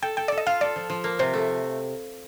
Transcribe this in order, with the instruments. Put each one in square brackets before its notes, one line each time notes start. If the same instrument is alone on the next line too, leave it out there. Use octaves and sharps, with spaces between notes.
[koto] A4 [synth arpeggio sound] G5
[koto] A4 [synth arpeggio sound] G5
[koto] A4 [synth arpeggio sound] D5
[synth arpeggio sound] D#5
[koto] F4 [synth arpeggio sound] F5
[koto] A4 [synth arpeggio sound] D5
[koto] F3
F3
A#3
[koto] C3 [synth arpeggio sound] C5
[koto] A3